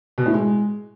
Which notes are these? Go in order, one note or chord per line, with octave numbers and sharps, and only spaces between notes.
B2
A2
G#3